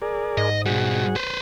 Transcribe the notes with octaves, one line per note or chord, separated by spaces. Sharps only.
G#4 A#4 D5
G#2 D#5
B2 G3 F#4 G#4 F#5
B4 C5